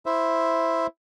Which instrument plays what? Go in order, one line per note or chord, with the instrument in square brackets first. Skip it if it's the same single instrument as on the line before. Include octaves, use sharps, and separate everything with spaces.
[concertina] E4 C5 E5